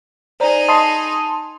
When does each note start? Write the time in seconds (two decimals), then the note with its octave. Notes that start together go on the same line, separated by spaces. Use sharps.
0.40 D#4 G#4 C5 D5 A#5
0.69 D#5 A5 B5 C6 D#6 C7